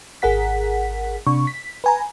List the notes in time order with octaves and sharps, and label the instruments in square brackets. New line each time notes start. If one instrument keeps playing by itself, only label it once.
[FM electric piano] G#1 G#4 A#4 F#5 B6
C3 D4 C#6
B6
B4 G#5 A#5